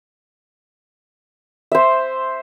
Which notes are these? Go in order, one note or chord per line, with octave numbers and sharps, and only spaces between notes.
C5 E5